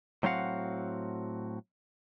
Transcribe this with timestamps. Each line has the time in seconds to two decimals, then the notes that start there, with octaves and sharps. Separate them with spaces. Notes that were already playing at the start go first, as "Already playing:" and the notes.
0.23 A2 F#3 C4 F#4 F5 F#5